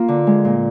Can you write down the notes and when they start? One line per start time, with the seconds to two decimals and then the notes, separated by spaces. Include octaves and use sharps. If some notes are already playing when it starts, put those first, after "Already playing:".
Already playing: A#3 F4
0.08 D3
0.27 G#3
0.45 A#2